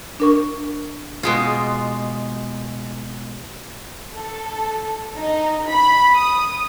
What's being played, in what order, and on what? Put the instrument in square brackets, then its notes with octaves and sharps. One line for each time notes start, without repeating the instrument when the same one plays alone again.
[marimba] D4 A#4 C#6
[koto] B2 G#3 F4
[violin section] A4
D#4
B5
D#6